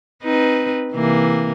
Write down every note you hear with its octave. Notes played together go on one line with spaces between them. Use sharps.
C4 D#4 B4
C3 E3 A#3